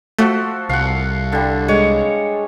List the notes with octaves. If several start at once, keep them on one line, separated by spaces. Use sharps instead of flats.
F3 A3 F#4 A4
C2 F5 F#5
D3 G3
G#3 G#4 C#5